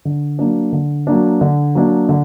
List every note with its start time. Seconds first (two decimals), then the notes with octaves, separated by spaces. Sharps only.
0.05 D3
0.39 F#3 A#3 D4
0.72 D3
1.07 F#3 A#3 D4
1.41 D3
1.75 F#3 A#3 D4
2.09 D3